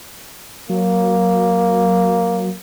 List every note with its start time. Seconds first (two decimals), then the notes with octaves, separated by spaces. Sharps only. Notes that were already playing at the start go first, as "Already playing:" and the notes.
0.70 F#3 A#3